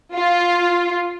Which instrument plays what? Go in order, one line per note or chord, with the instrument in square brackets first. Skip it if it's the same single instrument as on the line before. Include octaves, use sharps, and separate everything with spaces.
[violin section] F4